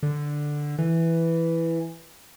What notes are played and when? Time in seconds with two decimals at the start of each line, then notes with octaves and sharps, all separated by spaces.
0.03 D3
0.78 E3